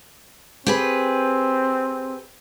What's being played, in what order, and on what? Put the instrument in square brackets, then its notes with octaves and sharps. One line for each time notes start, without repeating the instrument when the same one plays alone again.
[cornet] C4 [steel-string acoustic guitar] G4 G#4 B4